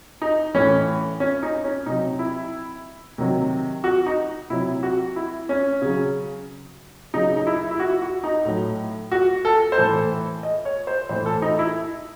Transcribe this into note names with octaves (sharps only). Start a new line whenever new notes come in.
D#4
A2 E3 C#4
C#4
D#4
C#4
C3 F#3 D#4
E4
C3 D#3 F#3
F#4
D#4
C3 F#3 E4
F#4
E4
C#4
C#3 F#3
C#3 F#3 D#4
D#4
E4
E4
F#4
F#4
D#4
A2 F#3
F#4
A4
C5
A2 E3 A4
D#5
C#5
C5
A2 E3 C5
A4
D#4
E4